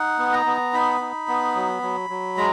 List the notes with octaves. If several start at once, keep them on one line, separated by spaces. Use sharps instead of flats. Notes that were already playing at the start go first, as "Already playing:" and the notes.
Already playing: D#4 F#5
B3
A#5
B3
D#4 B5
D#4
B3
F#3
F#3
F#3
G#3 A#5